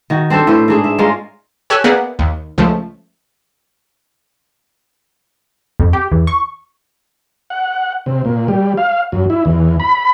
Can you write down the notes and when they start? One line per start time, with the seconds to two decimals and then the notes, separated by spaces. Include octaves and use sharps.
0.10 D#3 F#4
0.30 C4 D4 A4 C5
0.47 A2 B4 C5
0.68 G#2 D4 G#4
0.84 E5
0.98 G#3 A#3 C#4 F4
1.70 G4 A4 C#5 G#5 E6 F#6
1.84 A#3 B3 G#4 D5 E5 F#5
2.19 D#2
2.58 C#2 F3 A3
5.80 F2
5.93 G4
6.11 E2
6.27 C#6
7.50 F#5
8.06 C3
8.25 A#2
8.48 G3
8.78 F5
9.12 F#2
9.30 E4
9.45 E2
9.80 B5